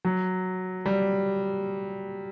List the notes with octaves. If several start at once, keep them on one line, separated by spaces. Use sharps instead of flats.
F#3
G3